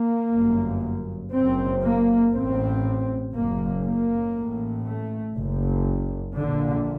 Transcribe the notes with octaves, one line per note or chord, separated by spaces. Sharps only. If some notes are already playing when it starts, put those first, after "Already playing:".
Already playing: A#3
G1 F#2
F#1 F#2 C4
A#3
A1 A2 C4
F#1 F#2 A#3
A#3
A1 A2
A3
F#1 F#2
A#1 A#2 D3